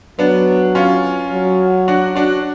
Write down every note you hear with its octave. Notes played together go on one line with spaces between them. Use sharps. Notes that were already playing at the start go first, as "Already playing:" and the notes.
F#3 B3 D4
C#4 F4
F#3
D4 F#4
D4 F#4